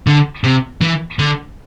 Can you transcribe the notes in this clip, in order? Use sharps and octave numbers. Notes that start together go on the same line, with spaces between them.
D3
C3
E3
D3